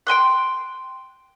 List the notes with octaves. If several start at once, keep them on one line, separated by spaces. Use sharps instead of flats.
G5 G#5 C6 F#6